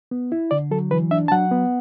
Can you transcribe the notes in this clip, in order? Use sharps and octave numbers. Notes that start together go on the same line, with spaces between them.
B3
E4
D3 D5
F#3 A4
E3 B4
D4 E5
A5
F#3 F#5
B3